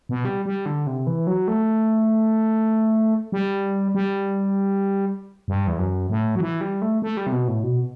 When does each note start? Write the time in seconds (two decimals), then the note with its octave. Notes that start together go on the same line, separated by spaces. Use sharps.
0.09 B2
0.25 G3
0.46 G3
0.66 D3
0.87 C3
1.07 E3
1.27 F#3
1.48 A3
3.32 G3
3.95 G3
5.48 G2
5.67 E2
5.79 F#2
6.10 A2
6.36 F#3
6.41 E3
6.61 G3
6.82 A3
7.02 A3
7.17 G3
7.27 C3
7.32 B2
7.48 A2
7.63 B2